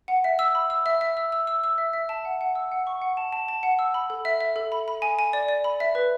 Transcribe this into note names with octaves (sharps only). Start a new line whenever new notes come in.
F#5
E5
E6
B5
E6
E5
E5
E6
E6
E6
E6
E5
E5
A5
F#5
F#5
E6
F#5
C#6
F#5
A5
A5
A5
F#5
E6
B5
A4
E5
E5
A4
B5
B5
G#5
G#5
D5
D5
B5
E5
B4